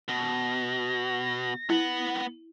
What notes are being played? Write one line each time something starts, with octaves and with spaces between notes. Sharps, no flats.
B2 A#6
B3 E4 F#5